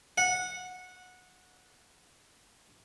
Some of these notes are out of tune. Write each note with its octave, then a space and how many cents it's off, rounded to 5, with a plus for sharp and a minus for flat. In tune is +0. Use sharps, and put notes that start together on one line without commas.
F#5 -15